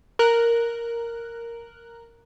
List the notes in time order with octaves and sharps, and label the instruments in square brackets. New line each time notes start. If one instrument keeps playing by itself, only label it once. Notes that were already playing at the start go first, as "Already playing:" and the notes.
[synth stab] A#4 F#6